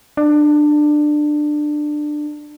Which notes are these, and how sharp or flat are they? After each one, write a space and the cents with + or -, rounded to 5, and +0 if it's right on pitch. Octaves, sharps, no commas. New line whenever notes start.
D4 +20